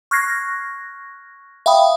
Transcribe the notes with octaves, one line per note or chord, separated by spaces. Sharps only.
C#6 F6 F#6 G#6 A#6 C7
E5 F5 G5 B5 D#6